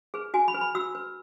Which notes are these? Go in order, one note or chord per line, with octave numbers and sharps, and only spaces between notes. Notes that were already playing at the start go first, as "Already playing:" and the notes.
G#4 B4
F#4 G#5
B5
B4
B5
F#4 E6
B4